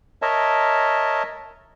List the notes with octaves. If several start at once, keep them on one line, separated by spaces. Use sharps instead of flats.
A#4 C#5 D#5 E5 A5